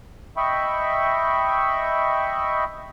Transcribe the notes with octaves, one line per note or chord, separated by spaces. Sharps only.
D#5 E5 G5 B5 C#6